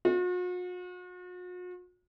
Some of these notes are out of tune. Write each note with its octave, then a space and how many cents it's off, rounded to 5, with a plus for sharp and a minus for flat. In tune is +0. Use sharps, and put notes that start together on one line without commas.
F#4 -45